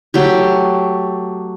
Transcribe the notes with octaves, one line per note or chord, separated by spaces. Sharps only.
F#3 A3 G4